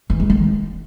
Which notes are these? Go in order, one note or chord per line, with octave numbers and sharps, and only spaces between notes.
E3
G#3
D#3